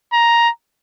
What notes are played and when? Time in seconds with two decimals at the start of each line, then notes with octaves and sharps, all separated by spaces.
0.13 A#5